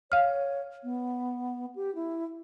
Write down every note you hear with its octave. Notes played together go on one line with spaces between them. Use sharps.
C#5 F5 F6
B3
G4
E4